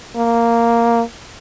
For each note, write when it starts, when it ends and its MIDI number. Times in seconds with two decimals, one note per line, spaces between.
0.16 1.02 58